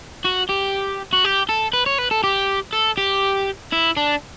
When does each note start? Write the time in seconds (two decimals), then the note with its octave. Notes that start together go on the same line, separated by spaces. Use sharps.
0.24 F#4
0.49 G4
1.13 F#4
1.24 G4
1.49 A4
1.73 B4
1.86 C#5
1.98 B4
2.11 A4
2.24 G4
2.73 A4
2.98 G4
3.72 E4
3.97 D4